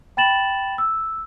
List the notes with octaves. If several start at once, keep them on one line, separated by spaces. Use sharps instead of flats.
G5 B5 A6 E7 F#7
E6